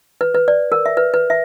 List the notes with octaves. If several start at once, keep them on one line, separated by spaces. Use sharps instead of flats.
B4
B4
D5
A#4
E5
B4
B4
E5